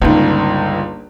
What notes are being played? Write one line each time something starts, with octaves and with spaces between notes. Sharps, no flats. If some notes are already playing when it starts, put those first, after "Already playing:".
G1 C#2 A#3 D#4